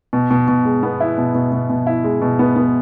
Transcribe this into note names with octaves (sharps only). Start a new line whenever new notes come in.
B2
B2
B2
G#3
B3
E4
B2
B2
B2
B2
E4
G#3
B2
B3
B3